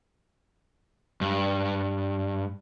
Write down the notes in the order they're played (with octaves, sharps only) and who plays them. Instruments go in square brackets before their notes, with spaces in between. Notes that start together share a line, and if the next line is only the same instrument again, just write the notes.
[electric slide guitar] G2